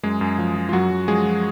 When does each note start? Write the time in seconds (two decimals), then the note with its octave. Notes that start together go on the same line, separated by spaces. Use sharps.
0.03 F#2 G#3 G#4
0.21 F#2
0.39 F3
0.56 F3
0.69 F4
0.73 F#2 F#3 F#4
0.91 F#2
1.08 F3 G#3 G#4
1.26 F3